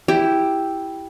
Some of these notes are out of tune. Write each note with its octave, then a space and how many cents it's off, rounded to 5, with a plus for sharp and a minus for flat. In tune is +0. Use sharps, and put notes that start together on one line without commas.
E4 +0 G4 +0